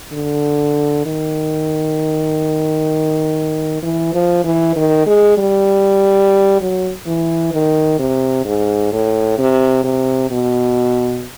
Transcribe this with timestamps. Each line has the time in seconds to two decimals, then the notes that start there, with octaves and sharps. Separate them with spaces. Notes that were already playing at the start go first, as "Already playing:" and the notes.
0.12 D3
1.06 D#3
3.83 E3
4.14 F3
4.44 E3
4.76 D#3
5.06 G#3
5.38 G3
6.61 F#3
7.07 E3
7.53 D#3
7.99 C3
8.45 G#2
8.92 A2
9.38 C3
9.84 C3
10.30 B2